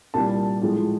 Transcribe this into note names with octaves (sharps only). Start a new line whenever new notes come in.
C2 A#2 G3 A5
A2 F3 G#3